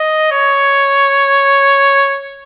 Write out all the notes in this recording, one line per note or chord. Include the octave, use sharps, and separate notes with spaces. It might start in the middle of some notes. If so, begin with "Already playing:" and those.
Already playing: D#5
C#5